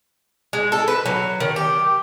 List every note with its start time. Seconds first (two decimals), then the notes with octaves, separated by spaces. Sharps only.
0.53 G#3
0.72 A4
0.88 B4
1.06 F#3
1.40 D#3
1.56 G4